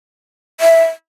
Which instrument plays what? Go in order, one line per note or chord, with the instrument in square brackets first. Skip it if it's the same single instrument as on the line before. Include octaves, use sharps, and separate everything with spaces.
[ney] E5